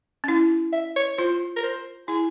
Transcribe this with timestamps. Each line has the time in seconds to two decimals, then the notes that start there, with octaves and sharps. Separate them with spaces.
0.24 C#4
0.28 E4
0.73 E5
0.96 C#5
1.18 F4 C5
1.57 A#4
1.63 C5
2.08 E4 G#4